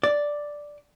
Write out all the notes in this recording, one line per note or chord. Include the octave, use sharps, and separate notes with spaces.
D5